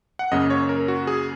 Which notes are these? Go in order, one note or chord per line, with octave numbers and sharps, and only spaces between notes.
F#5
F#2 C#3 A#3 D#5
C#5
A#4
F#4
G#4